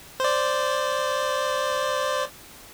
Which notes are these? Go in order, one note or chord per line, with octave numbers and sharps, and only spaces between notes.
C5 D5